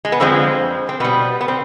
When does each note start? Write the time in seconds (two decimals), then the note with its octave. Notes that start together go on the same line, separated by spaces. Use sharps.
0.05 G#3
0.12 B3
0.20 F2 D3 F3 G#3 C4
0.89 C4
1.00 B2 G3 B3
1.41 B3
1.48 C4